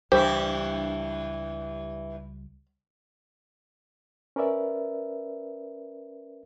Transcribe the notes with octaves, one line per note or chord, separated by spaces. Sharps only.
C#2 G2 E3 G3 E4 G4 C5
C#4 A#4 B4 D5 E5